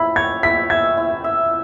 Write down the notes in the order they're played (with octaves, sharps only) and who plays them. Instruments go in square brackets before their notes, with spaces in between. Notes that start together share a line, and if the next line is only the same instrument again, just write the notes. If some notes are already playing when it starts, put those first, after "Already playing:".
Already playing: [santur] E4 [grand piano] B5
[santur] C#5 [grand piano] G#6
[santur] E4 [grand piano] B6
[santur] E5 [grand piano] G#6
[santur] E4
E5